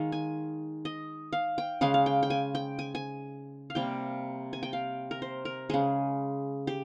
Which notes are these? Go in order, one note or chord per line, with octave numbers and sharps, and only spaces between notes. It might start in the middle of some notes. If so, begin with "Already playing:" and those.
Already playing: D#3 G#3 F5
G#5
D#5
F5
G5
C#3 G#3 F5
F5
G5
G5
G#5
G5
G#5
G#5
F5
C3 G3 A#3 G5
G#5
G5
F5
A#4
C5
A#4
C#3 G#3 G#4
G4